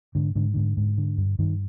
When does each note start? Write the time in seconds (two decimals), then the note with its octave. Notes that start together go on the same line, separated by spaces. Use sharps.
0.15 G#2 D3
0.35 G#2 D3
0.54 G#2 D3
0.77 G#2
0.98 D3
1.18 G2
1.39 G2 D#3